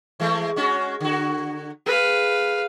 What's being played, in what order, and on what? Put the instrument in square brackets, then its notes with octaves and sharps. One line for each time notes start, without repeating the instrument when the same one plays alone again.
[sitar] E3 G#3 A3
G#3 C#4 F#4
D3 F#4
[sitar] G#4 [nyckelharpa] B4 F5